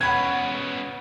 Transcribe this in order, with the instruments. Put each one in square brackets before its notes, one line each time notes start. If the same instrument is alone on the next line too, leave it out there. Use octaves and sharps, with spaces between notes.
[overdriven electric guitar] C#3 B3 [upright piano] F#5 B5 G#6